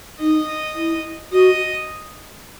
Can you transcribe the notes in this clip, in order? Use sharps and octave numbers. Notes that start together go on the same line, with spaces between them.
D#4 D#5
E4
F#4 D#5